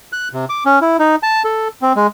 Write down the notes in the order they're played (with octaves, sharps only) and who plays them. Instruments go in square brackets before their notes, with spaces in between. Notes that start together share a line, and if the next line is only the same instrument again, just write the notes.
[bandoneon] F#6
C3
D6
C#4
E4
D#4
A5
A4
C4
G#3